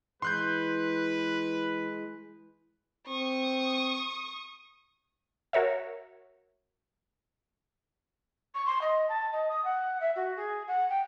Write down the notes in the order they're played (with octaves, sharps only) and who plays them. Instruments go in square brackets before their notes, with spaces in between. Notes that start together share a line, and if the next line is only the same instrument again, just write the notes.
[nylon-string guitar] E3 [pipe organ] G#3 [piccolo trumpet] B4 [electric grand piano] C6 F#6 G6
[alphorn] C4 [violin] C#6 D#6
[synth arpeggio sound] F#4 A#4 C#5 E5
[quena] C#6
C6
D#5
A5
D#5
D#6
F#5
E5
F#4
G#4
F#5
G5